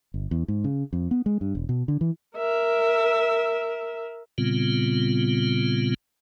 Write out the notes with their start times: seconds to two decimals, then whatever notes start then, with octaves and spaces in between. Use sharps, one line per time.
0.14 G1
0.31 E2
0.48 G#2
0.64 C#3
0.93 F2
1.11 B3
1.26 G#3
1.41 G2
1.55 E1
1.69 B2
1.88 D3
2.01 E3
2.36 A#4 E5
4.38 A#2 C#3 G3 B3 C4 F4